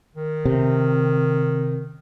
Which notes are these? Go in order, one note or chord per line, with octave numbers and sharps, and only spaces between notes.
D#3
C3